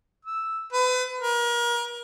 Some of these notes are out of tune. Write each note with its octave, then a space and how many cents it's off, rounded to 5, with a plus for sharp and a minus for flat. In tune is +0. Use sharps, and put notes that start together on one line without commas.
E6 -5
B4 +35
A#4 +35